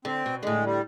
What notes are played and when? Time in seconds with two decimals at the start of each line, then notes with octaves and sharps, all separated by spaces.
0.05 D3 C4
0.26 B2
0.43 A2 D3 G#3
0.65 G3